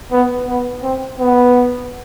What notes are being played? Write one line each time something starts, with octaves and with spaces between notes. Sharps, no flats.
B3
B3
C4
B3